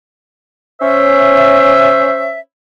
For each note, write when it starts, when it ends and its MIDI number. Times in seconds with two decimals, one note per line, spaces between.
0.81 2.38 61
0.81 2.38 72
0.81 2.38 76